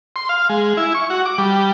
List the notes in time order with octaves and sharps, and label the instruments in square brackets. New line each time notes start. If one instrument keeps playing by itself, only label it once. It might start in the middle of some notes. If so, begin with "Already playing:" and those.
[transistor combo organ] C6
F5
G#3
E4
C#6
F#4
D6
G3